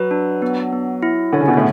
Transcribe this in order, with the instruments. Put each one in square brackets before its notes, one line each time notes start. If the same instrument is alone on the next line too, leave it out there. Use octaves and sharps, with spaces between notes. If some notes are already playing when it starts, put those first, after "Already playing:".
Already playing: [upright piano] F#3 [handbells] B4
[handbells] D4
B3
B3
E4
[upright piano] D3 [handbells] C#5
[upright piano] C#3
B2
A2